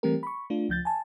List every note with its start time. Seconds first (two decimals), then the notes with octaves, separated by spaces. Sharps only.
0.03 E3 G3 A3 C4 G4 A#4
0.23 B5 C#6
0.50 A3 D4 F4
0.69 C#2 F3 G6 A6
0.85 G#5 A5